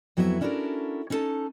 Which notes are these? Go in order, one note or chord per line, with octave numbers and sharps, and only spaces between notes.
F2 F#3 B3 E4 G#4 E5
C#4 D4 E4 F#4 A4 A#4
C#4 D#4 E4 A4 A5